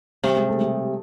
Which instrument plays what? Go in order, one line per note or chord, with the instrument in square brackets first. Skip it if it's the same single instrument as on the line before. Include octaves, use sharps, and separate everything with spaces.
[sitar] C3 [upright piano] G3 G4
[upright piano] G#3 G#4
A3 A4
G3 G4